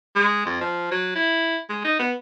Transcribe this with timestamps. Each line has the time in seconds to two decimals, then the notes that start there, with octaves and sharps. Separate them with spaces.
0.16 G#3
0.46 F2
0.61 F3
0.91 F#3
1.16 E4
1.70 G#3
1.85 D#4
1.99 B3